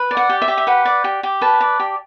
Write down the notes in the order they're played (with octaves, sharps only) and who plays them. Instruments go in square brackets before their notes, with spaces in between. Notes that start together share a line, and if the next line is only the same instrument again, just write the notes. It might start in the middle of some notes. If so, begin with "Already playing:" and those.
Already playing: [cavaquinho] B4
D5
F#5
G4
E5
G4
E5
B4 F#5
D5
G4
G4
B4 A5
D5
G4